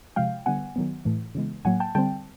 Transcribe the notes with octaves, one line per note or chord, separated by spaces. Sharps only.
C3 F3 G#3 F5 G5
D3 G3 B3 F#5 G#5
D#3 F#3 B3
A2 E3 A3
C#3 E3 G#3 B3
A2 F#3 A#3 F#5 G#5
G5 A5
D3 G3 C4 G5 A5